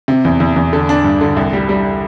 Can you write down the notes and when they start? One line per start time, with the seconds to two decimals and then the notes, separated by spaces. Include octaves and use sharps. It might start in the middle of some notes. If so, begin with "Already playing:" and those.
0.08 C3
0.25 E2
0.40 E2
0.56 E2
0.73 D3
0.89 D4
1.04 G2
1.21 D3
1.37 C2
1.53 G3
1.69 G3